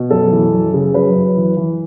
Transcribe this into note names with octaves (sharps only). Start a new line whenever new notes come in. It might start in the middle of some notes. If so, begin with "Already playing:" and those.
Already playing: B2
F#2 A4
E3
F#2
C#3
F#2 B4
F#2
E3
E3